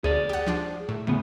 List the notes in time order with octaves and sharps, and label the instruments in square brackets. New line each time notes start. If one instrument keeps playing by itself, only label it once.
[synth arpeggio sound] D2 [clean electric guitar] G#4 D5
[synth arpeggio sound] G4 F#5
F3 D4 F4
A2
[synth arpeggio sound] E2 [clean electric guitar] A2 C#3 B3